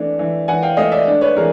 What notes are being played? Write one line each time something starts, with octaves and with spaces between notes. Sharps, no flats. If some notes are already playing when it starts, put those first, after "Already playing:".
Already playing: E3 A3 D4
E3
E3 F#5 G#5
F5 G5
A3 D#5 F5
D5 E5
D4
B4 C#5
E3 G#4 A#4